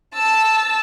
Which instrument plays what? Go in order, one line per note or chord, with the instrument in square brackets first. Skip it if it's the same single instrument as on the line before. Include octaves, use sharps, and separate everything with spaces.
[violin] A5 E6